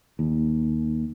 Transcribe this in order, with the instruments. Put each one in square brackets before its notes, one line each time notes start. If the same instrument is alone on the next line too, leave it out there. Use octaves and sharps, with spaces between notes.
[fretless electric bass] D#2